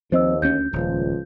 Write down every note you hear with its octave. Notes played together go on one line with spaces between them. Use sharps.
D#2 F3 C4 C5 D#5 E6
D2 C#4 G6
D#1 C#2 F3